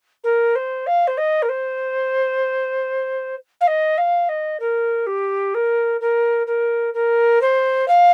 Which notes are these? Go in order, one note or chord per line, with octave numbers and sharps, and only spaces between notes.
A#4
C5
F5
C5
D#5
A#4
C5
F5
D#5
F5
D#5
A#4
G4
A#4
A#4
A#4
A#4
C5
F5